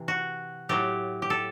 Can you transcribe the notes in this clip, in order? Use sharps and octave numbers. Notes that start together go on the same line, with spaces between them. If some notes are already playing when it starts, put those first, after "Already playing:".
Already playing: C3 E3
F#4
A2 F#3 A3 G4
G4
A4